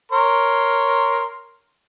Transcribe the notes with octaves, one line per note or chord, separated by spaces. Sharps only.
A#4 C#5 C6